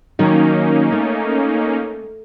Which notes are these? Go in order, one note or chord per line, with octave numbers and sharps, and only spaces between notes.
D#3 F#3 A#3 C#4 D#4
A3